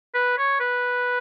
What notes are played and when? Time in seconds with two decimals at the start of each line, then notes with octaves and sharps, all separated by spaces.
0.14 B4
0.38 C#5
0.60 B4